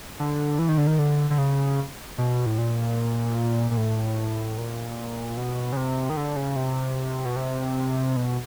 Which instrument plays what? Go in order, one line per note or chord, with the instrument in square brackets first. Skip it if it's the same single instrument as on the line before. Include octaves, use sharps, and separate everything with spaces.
[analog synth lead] D3
E3
D#3
D3
D#3
D3
D3
C#3
B2
A2
A#2
A#2
A2
A#2
B2
C#3
C3
D#3
D3
C#3
C3
B2
C3
B2